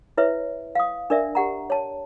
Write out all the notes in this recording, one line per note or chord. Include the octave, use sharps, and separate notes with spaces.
E4 B4 C#5 E5
F5 D#6
D4 A#4 D5 E5
G4 F#5 A#5
C#5 A5